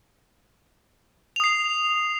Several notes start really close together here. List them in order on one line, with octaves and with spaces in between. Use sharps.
F7 D#6 C7